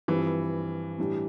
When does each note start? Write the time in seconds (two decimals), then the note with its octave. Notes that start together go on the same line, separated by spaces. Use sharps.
0.08 G2 E3 F3 C4 G4
0.98 A2 G3 D4 G4